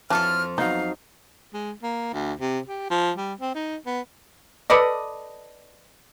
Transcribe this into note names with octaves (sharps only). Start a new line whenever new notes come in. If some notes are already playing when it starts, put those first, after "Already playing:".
F2 E3 F#3 F4 A4 A5 F6
F#3 B3 D#4 F5
G#3
A#3
D2
C3
G4
F3
G3
C4
D#4
B3
A4 B4 D5 D#5